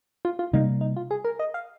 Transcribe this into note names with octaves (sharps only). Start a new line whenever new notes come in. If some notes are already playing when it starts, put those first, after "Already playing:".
F4
F4
C3 G3 A#3 D#4
D#4
F4
G#4
A#4
D#5
F5